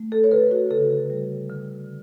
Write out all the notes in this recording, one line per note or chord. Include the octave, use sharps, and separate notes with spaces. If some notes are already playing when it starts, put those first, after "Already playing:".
Already playing: A3
A4
C#5
D3 B4
F#4
C#3 A4
G3
D3